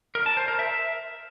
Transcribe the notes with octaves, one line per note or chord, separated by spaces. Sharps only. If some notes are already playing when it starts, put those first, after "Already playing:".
A#4
A5
C5
A#4
E5